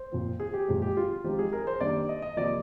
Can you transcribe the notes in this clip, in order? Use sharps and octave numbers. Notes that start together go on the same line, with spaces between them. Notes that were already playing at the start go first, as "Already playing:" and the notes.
Already playing: C5
A#2 F3 C4
G#4
G4
A#2 F3 G#3 C4 G#4
G4
F4
F3 G#3 C4 D#4 G4
G#4
A#4
C5
D#3 G3 A#3 D4 D5
D#5
D#5
C3 F3 A#3 D5